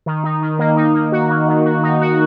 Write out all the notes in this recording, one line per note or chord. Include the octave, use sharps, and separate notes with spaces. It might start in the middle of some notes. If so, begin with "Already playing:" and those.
D#3
D#4
D#3
A#3
D#4
A#3
F#4
A#3
D#3
F#4
D#4
F#4